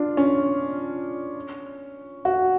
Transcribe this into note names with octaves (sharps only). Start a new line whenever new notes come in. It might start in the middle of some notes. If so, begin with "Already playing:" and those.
Already playing: D4 F4
C#4
F#4